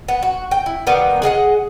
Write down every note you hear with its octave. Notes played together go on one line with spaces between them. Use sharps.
B3
F#4
G5
E4
D#3 G3 A#3 B3
G#4 D#5 F5 F#5